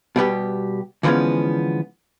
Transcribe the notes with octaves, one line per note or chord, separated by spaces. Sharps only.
B2 G3 B3 G4
D3 E3 F3 G#3 B3 C#4